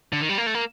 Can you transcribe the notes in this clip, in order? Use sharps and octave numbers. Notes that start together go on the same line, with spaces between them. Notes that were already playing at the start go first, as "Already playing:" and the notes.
D3
D#3
G3
A#3
A3
A#3